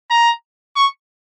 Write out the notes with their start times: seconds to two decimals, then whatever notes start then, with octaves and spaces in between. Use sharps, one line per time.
0.10 A#5
0.76 C#6